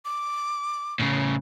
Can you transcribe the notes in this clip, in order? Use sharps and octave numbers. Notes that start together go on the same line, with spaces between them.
D6
A2 C#3